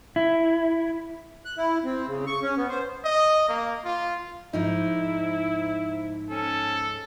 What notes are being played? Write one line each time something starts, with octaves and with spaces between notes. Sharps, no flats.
E4
F#6
E4
C4
C#3
C#6
C#4
B3
C5
D#5
A#3
F4
G#2 F3 D#4 E4
C#4 A4